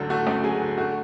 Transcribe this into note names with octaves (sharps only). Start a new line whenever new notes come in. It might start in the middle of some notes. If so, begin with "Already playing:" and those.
Already playing: D2 D3 F#3 A3 A4
A3 F#4
D2
F#3 G#4
D3
A3 F#4